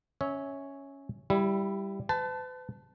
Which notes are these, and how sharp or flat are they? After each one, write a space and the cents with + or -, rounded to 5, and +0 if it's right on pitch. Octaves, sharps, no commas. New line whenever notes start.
C#4 +0 C#5 +0 E5 -20
G3 +0 E4 +15
B4 +40 A5 +0